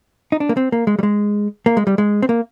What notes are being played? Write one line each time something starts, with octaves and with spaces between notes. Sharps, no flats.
D#4
D4
A#3
C4
A#3
G#3
G3
G#3
A#3
G#3
G3
G#3
C4
A#3